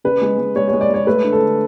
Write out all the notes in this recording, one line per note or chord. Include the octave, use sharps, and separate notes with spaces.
C#3 B4
G#3
G#3
G#3 C#5
G#3 C#5
D5
G#3 C#5
A3 B4
D3
A4
D3